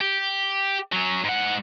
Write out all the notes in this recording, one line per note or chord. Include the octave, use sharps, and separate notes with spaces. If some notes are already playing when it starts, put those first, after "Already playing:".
G4
F#3 C#4
G#2 F#5